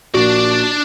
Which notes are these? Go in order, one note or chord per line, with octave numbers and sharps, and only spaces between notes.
A#1 A#3 D4 F#4 D5